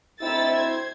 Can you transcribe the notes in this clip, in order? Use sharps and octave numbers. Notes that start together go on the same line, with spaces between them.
D2 C4 D#4 E4 E6 A6
C5 G#6